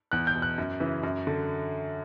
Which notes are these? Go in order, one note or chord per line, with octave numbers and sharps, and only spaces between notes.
E2 F#6
G6
B2
F#6
F#2
C#3 E3
F#2
D3